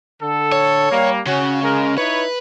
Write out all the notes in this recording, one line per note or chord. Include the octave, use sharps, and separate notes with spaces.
D3 A4
C#5
G3 A#3
C#3 C#4 F#4
G#3 A#4
D#4 E4 B4 C#5